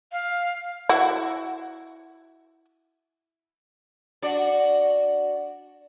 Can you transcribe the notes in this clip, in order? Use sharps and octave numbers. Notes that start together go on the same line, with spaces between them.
F5
E4 F#4
D4 F#4 D5